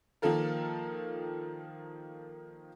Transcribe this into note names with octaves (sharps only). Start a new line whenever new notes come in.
D#3 F3 A#3 F4 A4 A#4